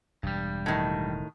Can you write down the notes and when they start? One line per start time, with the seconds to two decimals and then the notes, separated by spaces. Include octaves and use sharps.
0.23 E1 G2 G3
0.66 A2 D#3